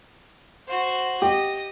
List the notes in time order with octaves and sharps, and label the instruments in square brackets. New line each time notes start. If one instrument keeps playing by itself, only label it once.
[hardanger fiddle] F#4 C5
[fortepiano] G4 [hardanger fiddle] D#5